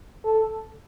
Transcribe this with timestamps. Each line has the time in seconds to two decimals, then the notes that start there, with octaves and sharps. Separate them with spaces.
0.25 A4